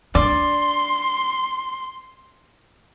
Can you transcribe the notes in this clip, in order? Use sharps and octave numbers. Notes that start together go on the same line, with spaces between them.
D4 D5 C6